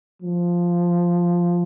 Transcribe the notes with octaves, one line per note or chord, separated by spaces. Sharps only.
F3